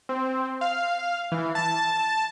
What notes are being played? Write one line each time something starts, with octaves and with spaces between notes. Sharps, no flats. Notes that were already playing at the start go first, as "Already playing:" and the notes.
C4
F5
E3
A5